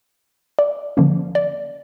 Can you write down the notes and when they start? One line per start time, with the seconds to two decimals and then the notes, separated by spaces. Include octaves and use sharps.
0.59 D5
0.97 D3 F3 A#3 C#4
1.35 D5